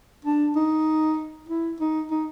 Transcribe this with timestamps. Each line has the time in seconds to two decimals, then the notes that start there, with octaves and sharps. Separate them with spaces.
0.25 D4
0.56 D#4
1.49 E4
1.80 D#4
2.11 D#4